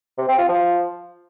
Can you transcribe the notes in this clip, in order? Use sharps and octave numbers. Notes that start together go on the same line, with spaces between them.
C3
C4
F4
F3